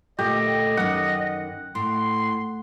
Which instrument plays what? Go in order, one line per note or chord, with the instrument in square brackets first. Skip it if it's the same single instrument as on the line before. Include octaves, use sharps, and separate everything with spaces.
[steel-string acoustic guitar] D2 A#2 A3 [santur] G4 [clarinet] D#5
[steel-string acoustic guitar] F#2 D#3 [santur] F#5
[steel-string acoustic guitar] A2 [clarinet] C6